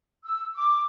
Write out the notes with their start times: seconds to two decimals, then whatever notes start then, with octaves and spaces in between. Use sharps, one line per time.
0.24 E6
0.56 D6